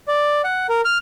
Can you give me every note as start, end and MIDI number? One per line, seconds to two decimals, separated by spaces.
0.08 0.42 74
0.44 0.67 78
0.69 0.81 70
0.85 0.98 89